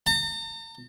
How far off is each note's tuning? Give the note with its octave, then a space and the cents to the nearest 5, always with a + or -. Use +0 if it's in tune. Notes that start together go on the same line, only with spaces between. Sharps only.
A#5 -45